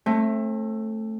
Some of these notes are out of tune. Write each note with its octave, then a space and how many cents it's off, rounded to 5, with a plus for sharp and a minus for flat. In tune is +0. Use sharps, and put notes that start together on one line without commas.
A3 +5 C4 +45